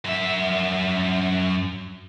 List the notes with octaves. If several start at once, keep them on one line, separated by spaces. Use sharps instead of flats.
F#2 E5